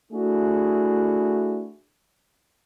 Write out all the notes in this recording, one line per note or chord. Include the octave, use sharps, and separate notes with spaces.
A3 D4 E4 F#4 G#4